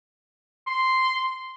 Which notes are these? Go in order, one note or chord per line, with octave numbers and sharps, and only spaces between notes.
C6